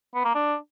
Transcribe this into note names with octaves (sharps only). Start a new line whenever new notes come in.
B3
A#3
D4